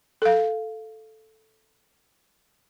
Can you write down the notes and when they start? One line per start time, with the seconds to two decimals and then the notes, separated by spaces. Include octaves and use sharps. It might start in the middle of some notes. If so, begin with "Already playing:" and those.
0.22 A4 F5